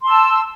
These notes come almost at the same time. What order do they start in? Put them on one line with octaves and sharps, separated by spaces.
C6 A5 E6